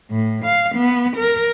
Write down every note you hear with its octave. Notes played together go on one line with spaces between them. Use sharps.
A2
F5
B3
A#4